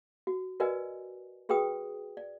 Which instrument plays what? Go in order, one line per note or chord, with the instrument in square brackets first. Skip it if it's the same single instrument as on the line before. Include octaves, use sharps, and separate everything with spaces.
[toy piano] F#4
F#4 A#4 B4 D5 D#5 G#5
F#4 G#4 B4 G5 D#6
D5